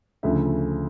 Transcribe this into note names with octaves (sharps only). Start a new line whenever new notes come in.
D2 C#3 F3 A3 E5